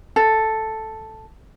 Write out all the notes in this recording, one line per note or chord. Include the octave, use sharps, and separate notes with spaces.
A4